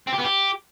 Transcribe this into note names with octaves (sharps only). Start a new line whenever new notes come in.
C4
G4
B3
G4